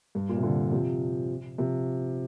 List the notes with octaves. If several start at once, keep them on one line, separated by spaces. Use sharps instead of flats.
G2
A#2
C3
A#2 D3
C3 F3
C3 F3